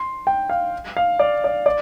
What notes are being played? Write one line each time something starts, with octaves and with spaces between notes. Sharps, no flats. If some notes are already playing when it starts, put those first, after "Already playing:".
Already playing: C6
G5
F5
F5
D5
D5
D5